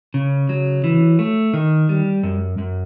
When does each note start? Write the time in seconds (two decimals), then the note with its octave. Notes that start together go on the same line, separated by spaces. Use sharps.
0.14 C#3
0.49 F#3
0.84 E3
1.19 A3
1.53 D#3
1.89 G3
2.23 F#2
2.58 F#2